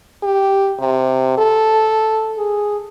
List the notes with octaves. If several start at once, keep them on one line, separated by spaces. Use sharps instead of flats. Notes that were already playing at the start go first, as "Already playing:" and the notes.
G4
C3
A4
G#4